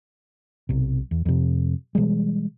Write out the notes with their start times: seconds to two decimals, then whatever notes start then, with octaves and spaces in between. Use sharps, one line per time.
0.69 B1 C3
1.11 E2
1.26 F2 C3
1.95 B2 E3 G3 G#3